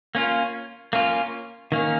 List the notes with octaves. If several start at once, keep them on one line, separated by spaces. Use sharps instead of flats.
A#3 C#4 F4
A#3 C#4 F4
D#3 A#3 C#4